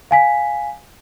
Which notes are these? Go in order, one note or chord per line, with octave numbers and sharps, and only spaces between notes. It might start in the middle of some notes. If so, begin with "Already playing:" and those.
F5 G#5 B6